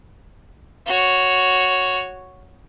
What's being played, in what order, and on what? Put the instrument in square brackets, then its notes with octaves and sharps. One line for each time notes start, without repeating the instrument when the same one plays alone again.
[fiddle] F#4 C#5